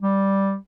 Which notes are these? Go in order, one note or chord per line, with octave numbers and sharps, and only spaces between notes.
G3